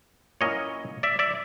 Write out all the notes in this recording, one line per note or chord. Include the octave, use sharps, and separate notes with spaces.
A#2 F#3 A#3 C#4 E4 C#5 D#5
D5 E5
D5 E5